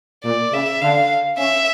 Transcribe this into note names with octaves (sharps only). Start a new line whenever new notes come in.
A#2 D5
C#3 E5
D3 F5
C#4 E5